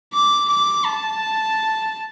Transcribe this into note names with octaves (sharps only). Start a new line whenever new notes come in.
D6
D6
A5